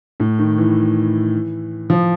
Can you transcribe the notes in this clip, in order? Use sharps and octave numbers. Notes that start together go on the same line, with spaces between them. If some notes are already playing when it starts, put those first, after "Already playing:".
A2
D#3
E3
F3